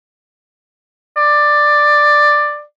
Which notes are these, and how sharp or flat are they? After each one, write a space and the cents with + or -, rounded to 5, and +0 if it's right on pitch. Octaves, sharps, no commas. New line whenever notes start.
D5 +10